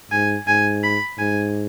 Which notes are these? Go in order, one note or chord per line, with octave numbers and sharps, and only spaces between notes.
G#2 G#5
G#2 G#5
B5
G#2 G#5